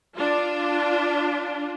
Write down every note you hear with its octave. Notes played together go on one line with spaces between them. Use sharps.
D4 F4